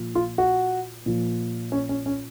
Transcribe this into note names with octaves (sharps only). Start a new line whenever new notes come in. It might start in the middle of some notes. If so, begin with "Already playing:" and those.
Already playing: A#2 F3
F4
F#4
A#2 F3
C#4
C#4
C#4